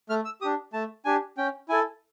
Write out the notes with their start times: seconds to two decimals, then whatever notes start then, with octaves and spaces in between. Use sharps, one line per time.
0.09 A3 F6
0.25 E6
0.41 G4 D#6
0.44 D4
0.73 A3 A5
1.05 D4 G4 G#5
1.37 C#4 G5
1.69 E4 A4 G#5